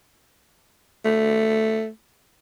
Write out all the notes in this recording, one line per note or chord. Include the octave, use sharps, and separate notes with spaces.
A3